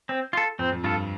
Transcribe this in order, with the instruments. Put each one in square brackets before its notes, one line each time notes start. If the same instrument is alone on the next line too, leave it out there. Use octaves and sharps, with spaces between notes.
[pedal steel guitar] C4
F4 A4
[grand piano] F2 [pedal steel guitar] C4
[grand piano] F2
[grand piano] G2 [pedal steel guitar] F4 A4